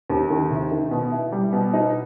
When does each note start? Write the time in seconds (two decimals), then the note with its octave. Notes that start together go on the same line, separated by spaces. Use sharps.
0.10 D#2
0.30 D#3
0.51 C3
0.71 D#3
0.91 B2
1.12 E4
1.32 G3
1.53 B2
1.73 D#4